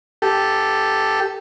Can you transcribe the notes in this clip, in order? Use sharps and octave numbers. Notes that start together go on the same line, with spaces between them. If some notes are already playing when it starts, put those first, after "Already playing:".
G4 A4